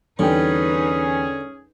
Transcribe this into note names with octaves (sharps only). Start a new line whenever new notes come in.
E2 D3 G3 C#4 D#4 G#4 B4 G5